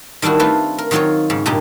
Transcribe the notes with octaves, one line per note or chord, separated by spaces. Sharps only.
D#3 G3 D4 E4 F#4
A3 C4 F4 B4
A#4
D#3 F#3 C4 F4 A#4 C#5
G#2 C#3
G2 A#2 C#3 D#4 G4